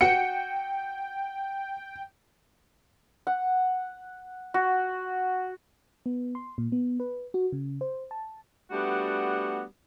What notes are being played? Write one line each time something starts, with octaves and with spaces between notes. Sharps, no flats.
F#4 G5 C#7
F#5
F#4
B3
C6
A#2
B3
B4
F#4
C#3
C5
A5
G3 A3 B3 D4 F#4